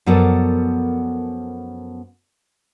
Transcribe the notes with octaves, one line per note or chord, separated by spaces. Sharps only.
F#2 F3 B3 A4 A#4 D5